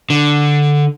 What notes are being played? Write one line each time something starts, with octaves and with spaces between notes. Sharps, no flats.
D3